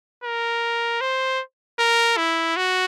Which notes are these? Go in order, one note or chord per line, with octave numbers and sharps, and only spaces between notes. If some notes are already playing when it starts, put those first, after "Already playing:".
A#4
C5
A#4
E4
F#4